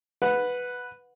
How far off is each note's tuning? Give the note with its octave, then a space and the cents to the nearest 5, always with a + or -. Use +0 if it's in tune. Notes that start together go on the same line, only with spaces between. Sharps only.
B4 +0 F#5 -20